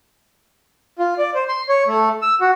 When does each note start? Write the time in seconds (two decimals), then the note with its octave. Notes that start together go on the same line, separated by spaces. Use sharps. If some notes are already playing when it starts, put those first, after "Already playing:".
0.99 F4
1.18 D5
1.35 C5
1.49 C6
1.69 C#5
1.87 A3
2.22 E6
2.41 F#4